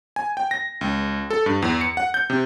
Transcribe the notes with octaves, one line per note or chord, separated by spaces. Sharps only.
G#5
G5
A#6
C#2
A4
G2
E2
C#7
F#5
G6
C3